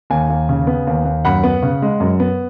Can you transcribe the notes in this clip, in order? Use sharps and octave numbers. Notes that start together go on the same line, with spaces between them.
D#2 G#5
D#2
C#3
B3
D#2
D#2
F#2 F#5 B5
B3
C#3
G#3
F#2
B3